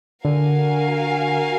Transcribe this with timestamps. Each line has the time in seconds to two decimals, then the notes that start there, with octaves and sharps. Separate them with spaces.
0.24 D3 F#4 A#4 F5 G#5